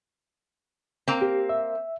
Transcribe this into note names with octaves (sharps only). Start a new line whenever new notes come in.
A#3 C4
G4
E5